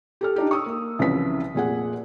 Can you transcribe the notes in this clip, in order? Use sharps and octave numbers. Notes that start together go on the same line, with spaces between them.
G4 A4 F6
D4 D#4 G4
C#6 D#6 E6
A#3
C2 C#3 E3 F3 B4 B6
F1 A#2 G#4 F#5